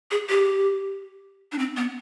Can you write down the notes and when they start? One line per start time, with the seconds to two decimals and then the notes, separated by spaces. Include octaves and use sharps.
0.11 G#4
0.29 G4
1.52 D4
1.59 C4
1.77 B3